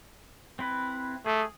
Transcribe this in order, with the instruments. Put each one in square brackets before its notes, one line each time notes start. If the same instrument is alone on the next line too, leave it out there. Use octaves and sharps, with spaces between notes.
[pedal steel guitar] C4 E4 B4
[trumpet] A3 [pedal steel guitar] G#4